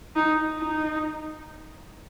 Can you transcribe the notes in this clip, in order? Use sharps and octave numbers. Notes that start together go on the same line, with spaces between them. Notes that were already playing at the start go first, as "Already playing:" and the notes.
D#4
D#4